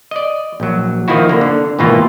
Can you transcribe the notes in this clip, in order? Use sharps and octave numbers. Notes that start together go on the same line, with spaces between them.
D5 D#5
A#1 F#3
D#3 F3 A#3 E4 F#4
D3 A#3
D3
G#1 B2 E3 A#3 F4